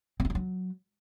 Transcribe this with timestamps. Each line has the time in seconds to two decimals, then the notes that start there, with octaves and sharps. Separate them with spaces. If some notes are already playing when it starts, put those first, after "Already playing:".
0.20 C4
0.25 E4
0.30 D4
0.35 F#3